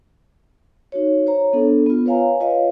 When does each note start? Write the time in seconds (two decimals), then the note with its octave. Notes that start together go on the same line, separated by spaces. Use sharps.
0.92 D#4 F#4 C#5
1.27 C5 C#5 A#5
1.53 B3 D4 A4
1.86 B3 F4
2.06 B4 C#5 F5 G#5 A#5
2.40 F4 B4 C#5 D#5 F5